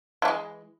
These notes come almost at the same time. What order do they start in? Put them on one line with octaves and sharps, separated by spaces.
E3 A3 G#3